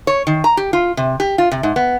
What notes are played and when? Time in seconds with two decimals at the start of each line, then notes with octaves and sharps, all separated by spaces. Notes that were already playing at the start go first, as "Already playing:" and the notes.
0.07 C#5
0.27 D#3
0.44 A#5
0.57 G4
0.73 F4
0.97 C3
1.20 G4
1.38 F4
1.52 C3
1.63 G#2
1.76 B3